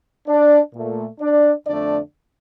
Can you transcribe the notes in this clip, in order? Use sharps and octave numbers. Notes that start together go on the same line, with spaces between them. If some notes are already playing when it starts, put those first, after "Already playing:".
D4 D5
A#2 A3
D4 D5
F2 D3 A3 D4 D5